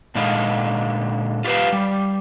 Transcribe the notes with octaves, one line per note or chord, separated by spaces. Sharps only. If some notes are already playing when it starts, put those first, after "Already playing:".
A#2 D3 G#3 D#4 F5
F4 G4 A#4 B4 F5
G3